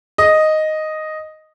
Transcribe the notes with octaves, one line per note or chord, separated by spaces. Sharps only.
D#5